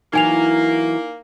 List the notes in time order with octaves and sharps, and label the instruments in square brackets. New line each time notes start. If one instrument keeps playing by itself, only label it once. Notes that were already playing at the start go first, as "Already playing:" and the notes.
[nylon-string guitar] E3 F#3 [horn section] A#3 [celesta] D#4 G#5 F7